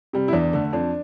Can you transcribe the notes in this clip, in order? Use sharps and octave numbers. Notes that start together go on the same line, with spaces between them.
C3 G3
E4
E2 D4
D3 A3
F2 D4